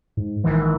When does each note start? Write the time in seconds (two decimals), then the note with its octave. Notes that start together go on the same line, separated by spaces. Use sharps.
0.17 G#2
0.44 A#1 G#2 D#3 E3